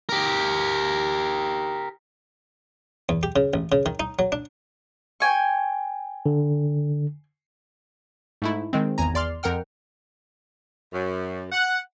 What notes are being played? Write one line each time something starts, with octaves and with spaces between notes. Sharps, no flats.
G4 A#4
E2
G4
C#3
A1
C#3
D#3
D#4
F#3
D4
G5 G#5 C#6
D3
G#2 A3 E4
D#3 G#3 C4
G#1 E2 G#5 A#5
E2 D5 C6 F6
F2 A#4 F#5 G5 F6
F#2
F#5